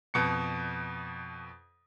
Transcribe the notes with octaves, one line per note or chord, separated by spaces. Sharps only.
F2 B2 C#7